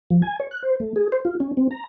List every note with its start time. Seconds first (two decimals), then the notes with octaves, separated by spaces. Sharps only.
0.10 F3
0.22 G#5
0.40 C#5
0.51 F#6
0.63 C5
0.80 A3
0.96 G#4
1.12 C5
1.25 F4
1.40 C#4
1.57 C4
1.71 A#5